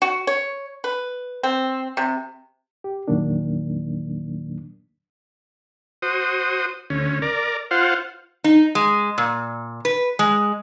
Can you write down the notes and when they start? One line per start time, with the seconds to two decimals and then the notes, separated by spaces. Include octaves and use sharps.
0.02 F#4
0.27 C#5
0.84 B4
1.43 C4
1.97 C3
2.84 G4
3.08 E2 A#2 D#3 F#3 A#3 D4
6.02 F#4 C5 D#6
6.90 D2 C#4
7.22 A#4 D5
7.71 F4 C5 F5 F#5
8.44 D#4
8.75 G#3
9.18 A#2
9.85 B4
10.19 G#3